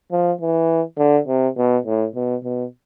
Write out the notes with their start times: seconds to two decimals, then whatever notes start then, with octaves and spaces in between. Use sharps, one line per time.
0.12 F3
0.41 E3
0.98 D3
1.28 C3
1.57 B2
1.86 A2
2.16 B2
2.44 B2